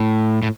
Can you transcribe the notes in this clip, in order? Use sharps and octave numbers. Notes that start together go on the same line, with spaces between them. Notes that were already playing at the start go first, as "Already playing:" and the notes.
Already playing: A2
A2